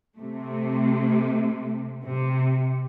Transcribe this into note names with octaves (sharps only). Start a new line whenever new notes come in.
C3 A3
C3